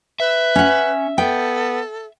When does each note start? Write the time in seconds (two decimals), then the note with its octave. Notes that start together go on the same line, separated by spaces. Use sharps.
0.20 B4 E5
0.56 C#4 F#5
1.18 B3 A4 G5